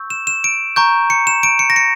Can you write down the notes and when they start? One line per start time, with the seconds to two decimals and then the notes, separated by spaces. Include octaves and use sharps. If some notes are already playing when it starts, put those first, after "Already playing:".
Already playing: C#6 E6 G6
0.10 E7
0.27 E7
0.44 D7
0.76 A#5 C#6 G6
1.10 C#7
1.27 E7
1.43 D7
1.59 C#7
1.70 A#6
1.76 C#7